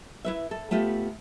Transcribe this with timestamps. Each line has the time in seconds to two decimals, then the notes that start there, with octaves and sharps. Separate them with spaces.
0.25 E4 B4 E5
0.51 A4
0.71 A3 B3 F4 G4